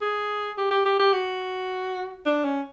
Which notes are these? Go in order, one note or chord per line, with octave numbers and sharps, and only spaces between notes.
G#4
G4
G4
G4
G4
F#4
D4
C#4